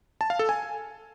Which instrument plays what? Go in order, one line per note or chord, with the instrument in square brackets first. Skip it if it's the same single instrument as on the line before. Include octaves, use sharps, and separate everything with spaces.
[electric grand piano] A5
F5
A4
G#5